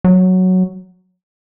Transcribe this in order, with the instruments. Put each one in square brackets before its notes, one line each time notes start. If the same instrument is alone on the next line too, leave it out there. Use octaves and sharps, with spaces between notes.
[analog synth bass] F#3